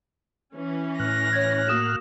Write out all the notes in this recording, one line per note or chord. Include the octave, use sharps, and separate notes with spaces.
E3 C#4
A2 F6 F#6 A#6
C#5 G#6
A#3 F#4 D#6 A#6 E7